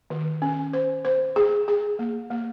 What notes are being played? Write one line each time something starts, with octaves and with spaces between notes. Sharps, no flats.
D#3
C#4
C5
C5
G#4
G#4
A#3
A#3